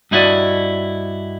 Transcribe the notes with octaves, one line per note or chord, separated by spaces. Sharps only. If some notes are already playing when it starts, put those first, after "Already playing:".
G2 D#4 E4 F#4 D5 D#5